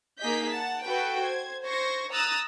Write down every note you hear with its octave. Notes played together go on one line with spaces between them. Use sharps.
A#3 D#4 G#4 D#5 G6 B6
F#5 A5
F#4 A4 B4 G5
C5 G#6
C5 C#6 G#6 A#6
A#5 D#6 E6 F#6 A6